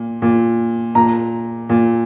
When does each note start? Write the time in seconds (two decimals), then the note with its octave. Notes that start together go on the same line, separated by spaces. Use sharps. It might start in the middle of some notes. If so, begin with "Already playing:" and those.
Already playing: A#2
0.22 A#2
0.95 A#2 A#5
1.69 A#2